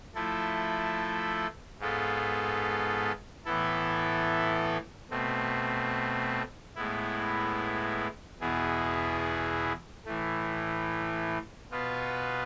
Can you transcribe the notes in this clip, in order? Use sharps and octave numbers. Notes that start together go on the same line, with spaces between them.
F3 A3 E4 A4
G#2 G#3 B3 F4 A4
A2 E3 B3 E4 A4
B2 A3 C4
A2 G#3 B3 E4
E2 B2 B3 E4 G#4
A2 E3 A3
B2 B3 F4 B4